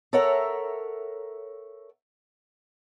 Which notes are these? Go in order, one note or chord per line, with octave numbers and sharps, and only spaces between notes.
A4 A#4 C#5 E5 F#5 A#5